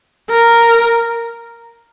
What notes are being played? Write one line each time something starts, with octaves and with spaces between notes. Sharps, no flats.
A#4